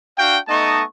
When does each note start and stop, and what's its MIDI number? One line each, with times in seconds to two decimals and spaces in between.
0.18 0.38 62
0.18 0.38 66
0.18 0.38 77
0.18 0.38 79
0.48 0.83 57
0.48 0.83 59
0.48 0.83 63
0.48 0.83 75
0.48 0.83 81
0.48 0.83 85